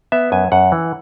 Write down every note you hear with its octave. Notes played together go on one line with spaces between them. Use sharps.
B3 E5
F#2 G#5
F#2 F#5
E3